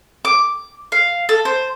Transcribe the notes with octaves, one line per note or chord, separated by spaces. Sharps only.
D6
F5
A4
C5